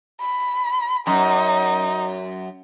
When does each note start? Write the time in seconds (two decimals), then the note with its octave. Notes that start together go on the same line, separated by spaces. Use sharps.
0.21 B5
1.07 F#2 D#4